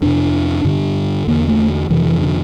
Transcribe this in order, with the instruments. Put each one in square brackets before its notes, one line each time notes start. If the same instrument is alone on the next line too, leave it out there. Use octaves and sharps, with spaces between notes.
[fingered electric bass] F2 C3 D4
G2 D3
E2 D3 A#3
A3
F2 C3 E3
E3
D3